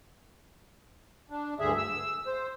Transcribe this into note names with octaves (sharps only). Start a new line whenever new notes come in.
D4
D2 G2 D3 G#4 E5
E6
C5